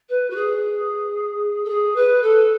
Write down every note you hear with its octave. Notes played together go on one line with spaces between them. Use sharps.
B4
F#4
G#4
A4
G#4
B4
A4